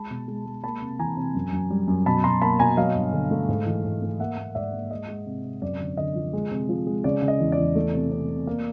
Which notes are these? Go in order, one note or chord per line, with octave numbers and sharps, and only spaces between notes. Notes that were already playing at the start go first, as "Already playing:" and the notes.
Already playing: G#3 A5 B5
B2
G#3
G#3
A#3 A5 B5
C3
E3 G#5 A#5
C3
F#2
F#2
G3
F#2
B2 A5 B5
B2 A#5 C6
A#3 A5 B5
B2 G#5 A#5
F#3 D#5 F5
G2
D3
A3
G#2
E3
G#2
A3
A#3 E5 F#5
A#3
G#2 D5 E5
A#3
G#3 D#5
G#3
C3
C3
F#2 D5
D3
D3 D#5
F3
G#3
C3
F3
G#3
C#3 D5
C#3
D#5
E2
D5
E2
A3
C3
C3
C3
A#3